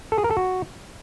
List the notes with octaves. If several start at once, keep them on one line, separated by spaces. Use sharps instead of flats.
A4
G#4
A#4
A4
F#4